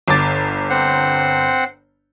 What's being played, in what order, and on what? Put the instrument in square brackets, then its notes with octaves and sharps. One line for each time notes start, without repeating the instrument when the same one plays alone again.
[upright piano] G1 D6 A6
[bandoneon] C4 C5 F#5